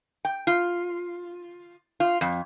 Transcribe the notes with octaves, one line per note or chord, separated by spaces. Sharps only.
G5
F4
F4
F2